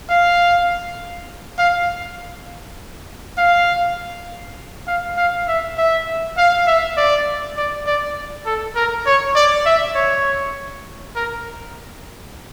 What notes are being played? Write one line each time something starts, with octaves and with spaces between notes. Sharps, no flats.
F5
F5
F5
F5
F5
E5
E5
F5
E5
D5
D5
D5
A4
A#4
C#5
D5
E5
C#5
A#4